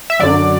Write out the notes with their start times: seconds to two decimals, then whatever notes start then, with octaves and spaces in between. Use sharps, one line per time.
0.10 E5
0.19 F#2 D3 F#3 D5